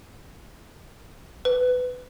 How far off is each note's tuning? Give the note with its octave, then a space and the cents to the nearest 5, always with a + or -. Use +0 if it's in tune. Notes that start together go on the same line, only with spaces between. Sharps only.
B4 +20